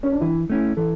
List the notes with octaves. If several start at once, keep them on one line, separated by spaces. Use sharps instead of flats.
C#4
D4
E3 E4
A3 C#4 E4
E3 A4